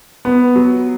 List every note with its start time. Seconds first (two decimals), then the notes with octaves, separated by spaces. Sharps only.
0.25 B3
0.56 F#3